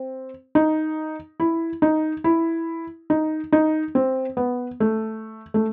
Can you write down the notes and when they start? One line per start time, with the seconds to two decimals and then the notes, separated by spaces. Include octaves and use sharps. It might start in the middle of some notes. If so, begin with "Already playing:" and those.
Already playing: C4
0.55 D#4
1.40 E4
1.82 D#4
2.24 E4
3.10 D#4
3.52 D#4
3.95 C4
4.37 B3
4.80 A3
5.54 A3